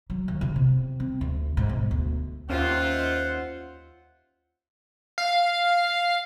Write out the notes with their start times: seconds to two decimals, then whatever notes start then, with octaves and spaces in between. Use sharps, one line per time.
0.10 F#3
0.28 D#2
0.41 C#3
0.56 C3
1.00 C4
1.21 D2
1.57 G#2
1.69 B1
1.91 D2
2.50 D#2 C#4 F4 C5 E5 F#5
5.18 F5